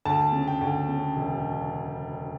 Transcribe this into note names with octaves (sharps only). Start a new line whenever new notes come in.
D2 A5
C#3
G5
D2
C#3
E1